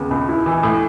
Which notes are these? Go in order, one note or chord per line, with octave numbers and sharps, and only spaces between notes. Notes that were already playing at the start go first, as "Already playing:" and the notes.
Already playing: D#2 C#3 B3
C#2
E4
E3
A2